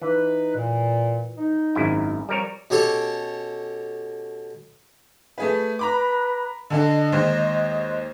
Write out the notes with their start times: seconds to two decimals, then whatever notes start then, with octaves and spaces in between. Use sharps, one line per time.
0.02 E3 D#4 B4
0.55 A#2
1.37 D#4
1.75 G#1 F#2 E4
2.29 F3 G3 C4 A#4 C#5
2.70 B2 C#4 G4 A4 C#5
5.38 A3 G#4 B4
5.79 B4 A#5 B5 D6
6.70 D3 D4 A4 D#5
7.12 D#2 G#3 C5